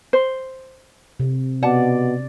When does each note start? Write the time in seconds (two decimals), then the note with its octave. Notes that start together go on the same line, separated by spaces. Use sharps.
0.13 C5
1.20 C3
1.63 B2 D5 F#5 A5